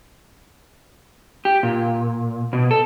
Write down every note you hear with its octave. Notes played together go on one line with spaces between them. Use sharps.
G4
A#2
B2
A4